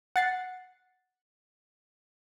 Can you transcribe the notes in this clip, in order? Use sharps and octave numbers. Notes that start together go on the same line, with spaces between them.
F#5 A6 C7